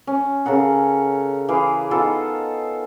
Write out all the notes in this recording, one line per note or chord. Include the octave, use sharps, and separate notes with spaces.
C#4
C#3 A4 A#4 F#5
E3 G#4 F5
B3 D#4 F4 A4